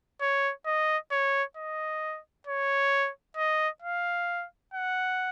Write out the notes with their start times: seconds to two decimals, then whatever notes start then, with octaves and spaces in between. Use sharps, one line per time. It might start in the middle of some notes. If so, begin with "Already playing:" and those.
0.21 C#5
0.66 D#5
1.12 C#5
1.57 D#5
2.47 C#5
3.37 D#5
3.82 F5
4.74 F#5